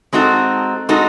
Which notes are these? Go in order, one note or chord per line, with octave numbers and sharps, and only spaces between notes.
G#3 C4 D#4 F#4 A4
G#3 C4 D#4 F#4 A4